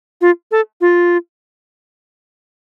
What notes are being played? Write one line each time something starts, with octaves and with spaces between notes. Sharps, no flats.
F4
A4
F4